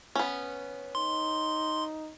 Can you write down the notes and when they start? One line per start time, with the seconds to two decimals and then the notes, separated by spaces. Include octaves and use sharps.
0.15 B3 C#4
0.95 D#4 C6